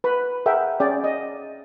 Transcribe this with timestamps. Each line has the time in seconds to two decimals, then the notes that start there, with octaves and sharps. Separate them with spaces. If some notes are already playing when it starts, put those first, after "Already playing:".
0.04 B4 B5
0.46 G#4 A#4 E5 F#5 G5
0.80 C#4 G#4 D5 G5
1.04 D#5